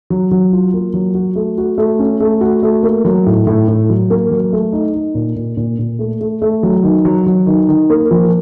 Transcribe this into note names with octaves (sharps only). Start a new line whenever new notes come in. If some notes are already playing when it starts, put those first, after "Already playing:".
F#3
F#3
F4
A#3
F#3
F#4
A3
F#4
A3
C#4
A3
F#4
A3
A#3
F#3
A2
A2
A2
F#3
A#3
F#3
A3
D#4
D#4
A#2
A#2
A#2
A#2
A3
A3
A3
F#3
D#3
F#3
F#3
D#3
D#3
A#3
F3